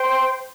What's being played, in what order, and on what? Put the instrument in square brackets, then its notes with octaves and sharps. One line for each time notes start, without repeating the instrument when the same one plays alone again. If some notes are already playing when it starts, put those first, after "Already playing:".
Already playing: [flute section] C5 G5 C6